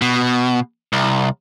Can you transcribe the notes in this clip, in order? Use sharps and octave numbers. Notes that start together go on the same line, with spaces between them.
B2
C2